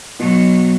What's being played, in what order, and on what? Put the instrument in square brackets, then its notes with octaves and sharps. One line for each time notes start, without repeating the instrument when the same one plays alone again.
[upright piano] B2 [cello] F#3